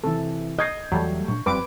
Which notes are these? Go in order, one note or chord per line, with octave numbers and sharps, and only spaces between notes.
C3 E3 A4
D#5 G6 G#6 C7
E2 E3 F#3 G3 A3
A#2 D4 C#6
F1 F#2 F3 G3 C4 B4 D6